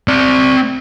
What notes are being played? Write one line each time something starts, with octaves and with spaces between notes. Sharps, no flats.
C4 D5